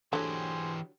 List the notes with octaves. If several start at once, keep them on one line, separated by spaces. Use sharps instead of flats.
D3 E3 F#3 G4 G#4 C5